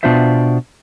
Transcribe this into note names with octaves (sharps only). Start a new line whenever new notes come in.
B2 B3 D4 F4 C5 E5